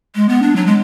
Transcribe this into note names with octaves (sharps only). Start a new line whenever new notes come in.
G#3
B3
D4
F#3
G#3